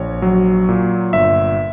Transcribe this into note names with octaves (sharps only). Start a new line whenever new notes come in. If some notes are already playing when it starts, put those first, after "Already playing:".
Already playing: A#1 C#5
F#3
A#2
G1 E5